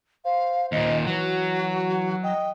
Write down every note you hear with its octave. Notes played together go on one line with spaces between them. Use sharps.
C5 F5
D#2 A#2 D#5
E3 F#3 F#4
D#5 G5